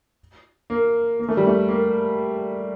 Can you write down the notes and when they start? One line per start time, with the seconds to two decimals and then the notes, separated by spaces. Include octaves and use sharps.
0.70 A#3
1.20 A#3
1.28 A3
1.37 G3
1.47 A3
1.68 A#3